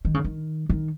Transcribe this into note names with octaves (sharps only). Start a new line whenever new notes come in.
D#3
C#3
D#3
D#3